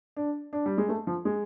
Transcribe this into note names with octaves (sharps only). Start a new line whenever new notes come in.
D4
D4
G3
G#3
A3
F3
G#3